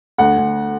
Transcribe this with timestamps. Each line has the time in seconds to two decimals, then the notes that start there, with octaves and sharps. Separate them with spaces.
0.18 D2 F#5
0.37 D2